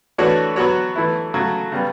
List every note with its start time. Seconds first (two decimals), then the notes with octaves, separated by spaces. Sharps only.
0.18 E3 A3 D4 F#4 C#5
0.56 F#3 B3 F#4 C#5
0.96 E3 A3 E4
1.34 C#3 F#3 A3
1.72 C#3 G3 B3